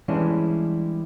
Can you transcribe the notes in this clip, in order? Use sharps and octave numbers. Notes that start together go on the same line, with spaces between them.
E3 G3 G#3 C#4 D4 E4